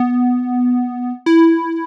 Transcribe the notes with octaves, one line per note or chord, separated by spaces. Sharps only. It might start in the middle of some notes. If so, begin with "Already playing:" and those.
Already playing: B3
E4